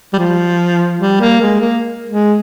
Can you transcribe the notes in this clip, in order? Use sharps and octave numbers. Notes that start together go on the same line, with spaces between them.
G3
F3
G3
A#3
G#3
A#3
G#3